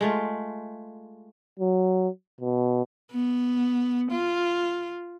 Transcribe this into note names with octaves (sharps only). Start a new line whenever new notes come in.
G#3 A3 F4
F#3
B2
B3
F4